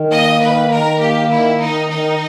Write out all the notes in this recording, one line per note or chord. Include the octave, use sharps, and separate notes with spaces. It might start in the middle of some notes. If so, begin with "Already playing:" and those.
Already playing: D#3
A#3 D#5
D#3 B4
D#3 A#4
A#3 G4
D#3 E4
D#3 D#4
D#3 D#4